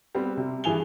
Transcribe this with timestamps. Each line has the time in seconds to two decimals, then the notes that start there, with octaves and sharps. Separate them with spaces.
0.15 G3 B3 C4
0.37 C3 G3
0.64 G2 E3 G#4 G#5 F7 G7